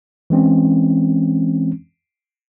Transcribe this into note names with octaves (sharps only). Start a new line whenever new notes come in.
E3 G#3 C4 C#4